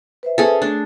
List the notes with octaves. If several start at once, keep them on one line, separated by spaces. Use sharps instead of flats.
B4 C5 E5
C#4 G#4 A4
A3 D4